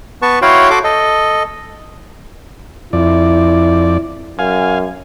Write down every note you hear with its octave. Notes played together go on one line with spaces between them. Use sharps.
B3 B4 A5 C#6
E4 F#4 C#5 F5 G5 C6
F#4 A4 C6 D6
A4 D#5
F2 E4 D5
F#2 F5 G#5